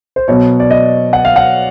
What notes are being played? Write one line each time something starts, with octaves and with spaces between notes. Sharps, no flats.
C5
B2 F#3 C#5
D5
D#5
F#5
F5
F#5